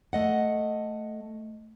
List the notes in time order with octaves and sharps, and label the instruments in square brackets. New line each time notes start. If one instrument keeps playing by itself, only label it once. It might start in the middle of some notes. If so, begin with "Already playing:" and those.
[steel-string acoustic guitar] A3 D#5 F#5